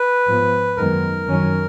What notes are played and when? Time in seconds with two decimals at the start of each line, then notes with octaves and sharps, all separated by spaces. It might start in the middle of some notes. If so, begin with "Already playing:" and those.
Already playing: B4
0.27 G#2 F3 B3
0.77 F#2 D#3 G#3 B3 A#4
1.26 F#2 D#3 F#3 C#4